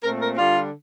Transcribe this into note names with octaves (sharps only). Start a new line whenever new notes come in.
A#2 A3 C4 A#4
A#4
D3 G3 D4 F4